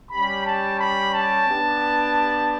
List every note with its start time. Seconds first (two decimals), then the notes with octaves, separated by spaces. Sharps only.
0.11 G3 C#4 G4 B5
0.44 A5
0.79 B5
1.14 A5
1.48 B3 D4 G4